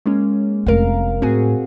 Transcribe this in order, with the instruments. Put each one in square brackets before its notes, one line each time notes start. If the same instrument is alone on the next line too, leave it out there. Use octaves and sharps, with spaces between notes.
[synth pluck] G#3 A#3 C#4
[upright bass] F1 A3 [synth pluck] A#4 F5
[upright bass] A2 [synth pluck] C4 F#4 G#4